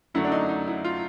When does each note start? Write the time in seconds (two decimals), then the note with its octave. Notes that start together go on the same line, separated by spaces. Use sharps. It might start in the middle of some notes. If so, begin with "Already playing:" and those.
0.14 F#2 D3 F#3 A3 E4
0.24 D4
0.32 D#4
0.49 D#4
0.68 E4
0.84 F4